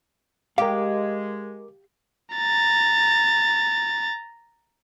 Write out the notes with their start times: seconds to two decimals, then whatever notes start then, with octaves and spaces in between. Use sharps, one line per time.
0.58 G#3 G4 A#4 F5 D6
2.35 A#5 A6